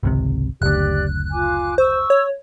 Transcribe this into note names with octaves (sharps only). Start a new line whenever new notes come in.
G#1 C#2 C3
F#1 D2 G4 D5 F#6
F4 G#5 D6
C5 C#6 E6
C#5